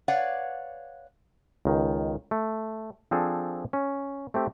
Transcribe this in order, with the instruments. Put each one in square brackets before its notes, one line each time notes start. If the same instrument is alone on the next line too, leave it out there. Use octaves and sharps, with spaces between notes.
[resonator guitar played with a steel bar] B4 C#5 D5 F5 F#5
[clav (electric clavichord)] C#2 D#3
A3
F3 C4 D4 G#4 A4
C#4
A3 C4 G4